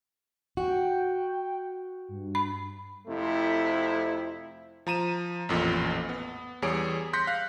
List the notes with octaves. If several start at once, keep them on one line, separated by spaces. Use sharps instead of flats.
F#4 G5
G2
B5
F2 C3 A3 E4
F3 A#5 D#7 E7
A1 F2 A#2
B3
E2 G3 G#4 C#5 D6 D7
C6 F#6 G6 A#6 B6 C#7
F5 F#6